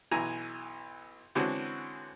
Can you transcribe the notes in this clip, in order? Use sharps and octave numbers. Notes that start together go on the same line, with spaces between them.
B1 E3 G#5 A#5
D3 E3 G#3 C4 C#4 F#4